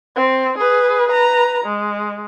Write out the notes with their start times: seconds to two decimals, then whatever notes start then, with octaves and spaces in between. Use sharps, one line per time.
0.16 C4
0.58 G#4 B4
1.08 B4 A#5
1.65 G#3